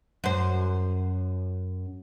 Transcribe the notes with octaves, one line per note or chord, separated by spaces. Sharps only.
F#2 C5